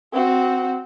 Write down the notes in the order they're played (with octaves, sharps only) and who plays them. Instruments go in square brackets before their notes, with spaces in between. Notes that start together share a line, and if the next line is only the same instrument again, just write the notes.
[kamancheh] C4 F#4